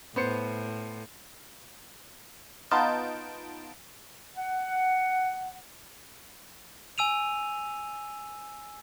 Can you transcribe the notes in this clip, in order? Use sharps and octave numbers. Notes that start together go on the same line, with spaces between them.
A2 B3 C5 C#7
B3 D#4 F4 A5 G6 D7
F#5
G#5 E6 D#7 F7